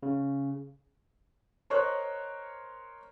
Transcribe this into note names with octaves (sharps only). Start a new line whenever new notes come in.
C#3
A#4 C5 C#5 D#5 C#6 F#6